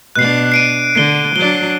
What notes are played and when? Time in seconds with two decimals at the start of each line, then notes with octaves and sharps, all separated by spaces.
0.16 B2 D4 F#6 C7
0.52 C7 D7 D#7
0.95 D3 C7 G7
1.36 F#3 D4 G7